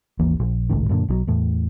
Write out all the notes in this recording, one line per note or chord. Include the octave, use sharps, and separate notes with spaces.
G#1 D#2 E3 A#3
A#1
G#1 C#2 A2 D#3
F#2 A#2 D3
B1 E3 F#3
E2 A2